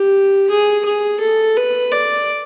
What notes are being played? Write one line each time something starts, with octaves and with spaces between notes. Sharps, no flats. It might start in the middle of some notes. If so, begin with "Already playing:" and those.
Already playing: G4
G#4
G#4
A4
B4
D5